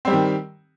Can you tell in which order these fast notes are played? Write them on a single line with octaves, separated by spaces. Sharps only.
C4 G3 G4 D#3